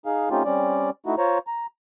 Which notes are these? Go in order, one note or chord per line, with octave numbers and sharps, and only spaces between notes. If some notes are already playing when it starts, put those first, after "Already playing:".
D#4 G#4 F5
A3 C4 C#4 D#4 F4 G4
G3 C4 C#4 D5
A3 D#4 E4 F#4
F4 C5 C#5 A#5
A#5